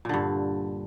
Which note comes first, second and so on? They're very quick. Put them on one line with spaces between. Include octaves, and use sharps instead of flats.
A#2 D3 G2